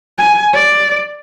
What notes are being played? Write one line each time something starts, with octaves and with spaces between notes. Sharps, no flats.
G#5
D5